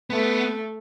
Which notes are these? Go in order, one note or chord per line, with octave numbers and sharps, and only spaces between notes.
A3 B3